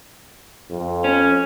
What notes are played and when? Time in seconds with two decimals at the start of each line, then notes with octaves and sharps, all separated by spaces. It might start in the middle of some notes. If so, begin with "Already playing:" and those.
0.70 F2
1.04 C#4